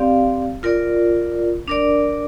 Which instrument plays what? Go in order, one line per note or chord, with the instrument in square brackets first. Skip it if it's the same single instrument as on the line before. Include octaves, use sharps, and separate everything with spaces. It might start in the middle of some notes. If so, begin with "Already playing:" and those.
Already playing: [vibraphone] C4 G4 D5 F5
F4 A#4 D5
D4 A#4 D5